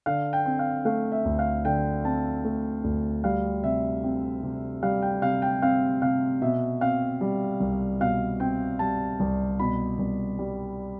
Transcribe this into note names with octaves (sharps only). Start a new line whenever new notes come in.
D3 F5
G5
C4
F5
A3 F5
E5
D2
F5
D3 G5
C4 A5
A3
D2
G3 F5
C3 E5
C4
C3
G3 F5
G5
C3 F5
G5
C4 F5
C3 F5
B2 E5
C4 F5
G3
C2
B2 F5
C4 G5
G3 A5
C2
B2 B5
C2
G3